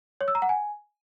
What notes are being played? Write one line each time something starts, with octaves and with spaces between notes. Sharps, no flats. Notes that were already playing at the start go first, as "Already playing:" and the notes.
C#5
E6
A#5
F#5
G#5